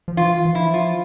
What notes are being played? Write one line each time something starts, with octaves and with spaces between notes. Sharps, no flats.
F3
E3 F4
E3
F3 E4
F4